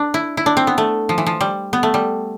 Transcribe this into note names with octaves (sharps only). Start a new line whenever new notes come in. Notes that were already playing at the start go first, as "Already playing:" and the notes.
Already playing: D4
E4
E4
D4
C4
B3
A3
F3
E3
F3
G3
B3
A3
G3